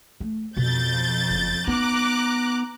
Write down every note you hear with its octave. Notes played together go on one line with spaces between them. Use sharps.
A3
F2 B2 G6 A6
F#1
B3 D#4 A#5 D6 F#6